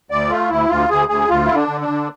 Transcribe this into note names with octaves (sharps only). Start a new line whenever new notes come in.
D2 D5
A3 F4
D2 E4
D2 F4
D2 G#4
D2 G#4
D2 F4
D3 E4
D4
D3
D4
D3